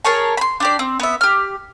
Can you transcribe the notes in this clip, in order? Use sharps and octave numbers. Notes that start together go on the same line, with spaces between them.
G#4 A#4 C#5 A5
B5 C6
D4 G4 D5
C4
B3 E5
G4 F6